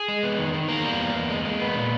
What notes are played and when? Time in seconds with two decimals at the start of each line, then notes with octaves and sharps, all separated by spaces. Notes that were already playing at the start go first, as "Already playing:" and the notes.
Already playing: G#4
0.08 G#3
0.23 B3
0.39 D#3
0.53 D#3
0.68 E2 A#3 A#4
0.84 G3
0.99 E2
1.14 E2
1.30 G#3
1.45 G#3
1.60 B3
1.75 A#2